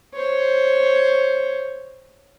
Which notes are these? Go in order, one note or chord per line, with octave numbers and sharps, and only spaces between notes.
C5 C#5